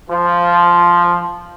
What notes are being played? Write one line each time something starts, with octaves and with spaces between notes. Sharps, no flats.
F3